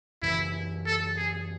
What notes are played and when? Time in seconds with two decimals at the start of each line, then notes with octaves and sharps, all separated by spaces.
0.22 F#2 C#3 E3 E4
0.86 A4
1.17 G#4